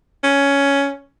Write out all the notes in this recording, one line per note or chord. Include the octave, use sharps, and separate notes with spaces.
C#4